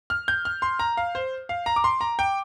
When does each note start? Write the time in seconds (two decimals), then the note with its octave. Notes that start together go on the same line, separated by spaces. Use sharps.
0.10 F6
0.28 G6
0.45 F6
0.62 C6
0.79 A#5
0.97 F5
1.15 C5
1.49 F5
1.66 A#5
1.76 D6
1.84 C6
2.01 A#5
2.19 G5